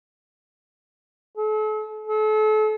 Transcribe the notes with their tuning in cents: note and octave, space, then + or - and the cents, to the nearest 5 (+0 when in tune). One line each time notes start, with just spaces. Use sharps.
A4 -40
A4 -35